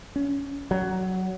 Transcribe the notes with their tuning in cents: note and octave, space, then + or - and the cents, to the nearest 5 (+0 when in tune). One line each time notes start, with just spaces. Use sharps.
C#4 +15
F#3 +10